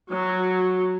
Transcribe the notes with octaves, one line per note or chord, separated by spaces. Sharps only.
F#3